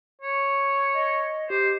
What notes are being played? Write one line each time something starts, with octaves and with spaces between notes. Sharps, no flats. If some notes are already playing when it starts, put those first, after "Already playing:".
C#5
D#5
G4 C5